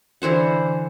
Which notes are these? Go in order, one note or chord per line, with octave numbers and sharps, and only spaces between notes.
D3 E3 C5 F#5